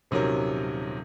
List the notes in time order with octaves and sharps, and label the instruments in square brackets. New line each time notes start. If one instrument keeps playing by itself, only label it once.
[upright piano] D#1 C3 D#3 F#3 C#4 A#4